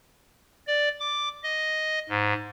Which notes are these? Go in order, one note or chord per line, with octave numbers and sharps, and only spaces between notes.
D5
D6
D#5
G#2